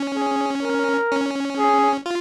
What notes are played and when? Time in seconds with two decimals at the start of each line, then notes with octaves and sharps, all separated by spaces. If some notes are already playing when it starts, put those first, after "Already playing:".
Already playing: C#4
0.15 G#4
0.63 A#4
1.11 C#4
1.58 G#4
2.06 F4